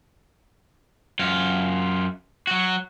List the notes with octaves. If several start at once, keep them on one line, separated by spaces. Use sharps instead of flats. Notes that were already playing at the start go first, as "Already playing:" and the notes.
F#2 F4
F#3 F#4